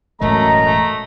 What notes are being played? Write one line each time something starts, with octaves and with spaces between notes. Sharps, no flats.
E1 F#2 A2 G#3 A3 A#4 D#5 A#5
A3